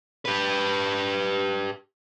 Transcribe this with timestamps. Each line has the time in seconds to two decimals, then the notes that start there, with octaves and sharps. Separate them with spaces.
0.25 G4 B4